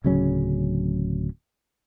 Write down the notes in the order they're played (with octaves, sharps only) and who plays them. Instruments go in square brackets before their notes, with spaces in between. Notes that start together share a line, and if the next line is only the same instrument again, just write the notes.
[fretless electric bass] D1 C#3 F#3 C#4